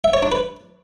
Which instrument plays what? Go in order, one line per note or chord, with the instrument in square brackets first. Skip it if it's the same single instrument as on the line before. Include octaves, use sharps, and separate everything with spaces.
[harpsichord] E5
C#5
D4
B4